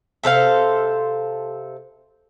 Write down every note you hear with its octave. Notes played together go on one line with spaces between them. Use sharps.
C3 A4 C5 F5